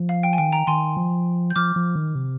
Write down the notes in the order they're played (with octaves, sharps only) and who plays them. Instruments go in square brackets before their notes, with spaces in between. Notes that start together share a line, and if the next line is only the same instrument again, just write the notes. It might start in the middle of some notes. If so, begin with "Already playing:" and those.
Already playing: [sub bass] F3
[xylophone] F5
G5
G#5
[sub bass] D#3 [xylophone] G5
[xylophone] G5 A#5
[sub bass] D#3 [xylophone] G#5 C6
[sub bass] F3
[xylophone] G6
[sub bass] F3 [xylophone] D6 F6
[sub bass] F3
D#3
C3